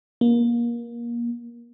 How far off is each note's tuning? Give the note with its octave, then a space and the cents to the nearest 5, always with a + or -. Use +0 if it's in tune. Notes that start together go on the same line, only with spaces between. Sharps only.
A#3 +25